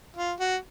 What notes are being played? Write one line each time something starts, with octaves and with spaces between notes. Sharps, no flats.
F4
F#4